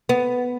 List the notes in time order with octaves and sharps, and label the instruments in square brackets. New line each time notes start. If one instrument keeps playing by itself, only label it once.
[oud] B3